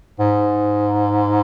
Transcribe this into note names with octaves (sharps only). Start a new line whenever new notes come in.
G#2